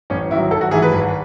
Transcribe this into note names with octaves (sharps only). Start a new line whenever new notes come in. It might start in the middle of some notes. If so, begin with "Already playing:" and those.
A1 C#4
G#2 D#3 F#3 E4
G#1 A4
F#4
G#2 E3 A3 G#4
B4
G#1